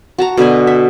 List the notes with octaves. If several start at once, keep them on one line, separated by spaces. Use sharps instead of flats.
F#4 A5 A#5
B2 D3 B4 G#5
E5